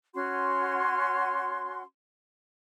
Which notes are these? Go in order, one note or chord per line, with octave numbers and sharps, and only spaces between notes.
C#4 F#4 F#5 C6